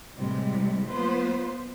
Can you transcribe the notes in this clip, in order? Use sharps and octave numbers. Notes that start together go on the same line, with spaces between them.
A2 C3 E3 G3 G#3
F#3 A#3 B3 F4 B4 C5